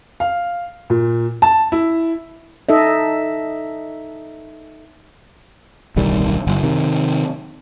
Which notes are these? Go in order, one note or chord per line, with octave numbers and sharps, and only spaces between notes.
F5
A#2
A5
E4
D#4 A4 D#5 E5
D1 B1 D#3 G3
F#1
C3 D#3